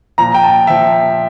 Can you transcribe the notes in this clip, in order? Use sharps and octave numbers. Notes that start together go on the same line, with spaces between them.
A#2 F3 A#5
G5
A5
A#2 F3 E5